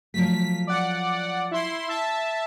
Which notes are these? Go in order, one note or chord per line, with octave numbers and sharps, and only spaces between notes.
F3 F#3 A3 B6
D5 F#5
E4 C6
E5 A5